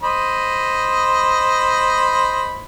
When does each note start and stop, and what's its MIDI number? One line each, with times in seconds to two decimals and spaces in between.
0.03 2.66 72
0.03 2.66 75
0.03 2.66 83